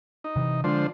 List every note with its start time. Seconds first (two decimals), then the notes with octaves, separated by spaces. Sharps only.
0.24 D#4
0.36 C3 E3
0.64 D3 F3 G#3 C5